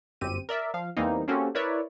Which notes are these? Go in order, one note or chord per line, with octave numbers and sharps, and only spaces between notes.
G1 F#2 C4 G4 D#7
A#4 D5 E5
F3 F5
E2 E3 G3 A#3 C4 D#4
A#3 C4 C#4 F#4 G4 A4
E4 A#4 B4 C#5 D5 E5